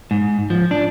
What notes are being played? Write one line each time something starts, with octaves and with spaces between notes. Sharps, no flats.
G#2
F3
D4